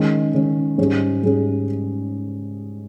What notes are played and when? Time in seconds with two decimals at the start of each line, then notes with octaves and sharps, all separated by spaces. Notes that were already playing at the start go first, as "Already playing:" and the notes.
Already playing: D#3 G#3 C#4
0.34 D#3 G#3 C#4
0.78 G#2 G3 C#4 G#4
1.23 G#2 G3 C#4 G#4